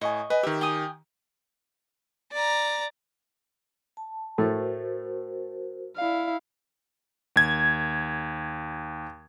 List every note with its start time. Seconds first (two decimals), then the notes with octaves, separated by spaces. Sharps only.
0.01 A2 D#5 G#5 C#6
0.30 B4 D#5 G#5
0.43 D#3 G4 E5
0.61 G5 G#5 D#6
2.32 D5 A#5
3.97 A5
4.38 A2 A3 F#4 A#4 C5
5.97 E4 D5 F5
7.36 D#2 G#6